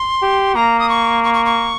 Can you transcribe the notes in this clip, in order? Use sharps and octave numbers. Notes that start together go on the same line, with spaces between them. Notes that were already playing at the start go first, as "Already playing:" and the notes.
Already playing: C6
G4
A#3 A#5
D#6
C#6
C#6
C#6
C#6